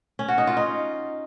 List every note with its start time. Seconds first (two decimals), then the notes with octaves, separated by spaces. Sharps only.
0.19 C#4
0.28 F#4
0.38 D#4
0.47 F4
0.57 D#4